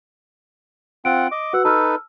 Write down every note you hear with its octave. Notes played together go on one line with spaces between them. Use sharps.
C4 F4 F#5 D7
D#5 D6
F#4 B4 F#5 E6
D#4 A4 B4 A5 E6 F6